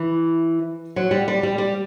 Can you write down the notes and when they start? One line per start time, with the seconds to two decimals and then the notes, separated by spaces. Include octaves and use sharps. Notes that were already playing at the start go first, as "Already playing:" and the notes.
Already playing: E3
0.96 F#3
1.11 G3
1.28 G3
1.43 G3
1.58 G3